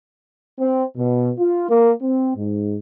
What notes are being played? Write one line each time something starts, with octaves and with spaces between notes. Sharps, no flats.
C4
B2
F4
A#3
C4
G#2